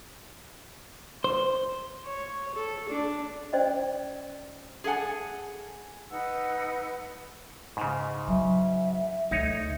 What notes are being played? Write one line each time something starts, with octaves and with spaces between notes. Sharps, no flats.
C5
C#5
A4
D4
C#4 C5 D5 D#5 G5
G#4 A4 D#5 F#5 G#5
D#4 B4 F#5 E6
G#2 C#3
F#3 E5
D2 D#4 C#5